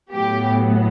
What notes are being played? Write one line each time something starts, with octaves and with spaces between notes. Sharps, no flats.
A2 F#3 B3 G4